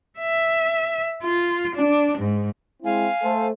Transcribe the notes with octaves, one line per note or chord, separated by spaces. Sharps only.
E5
F4
D4
G#2
G#3 C4 E4 F5 G#5
A3 A4 C5